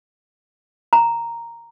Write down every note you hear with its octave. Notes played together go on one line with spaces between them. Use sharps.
A#5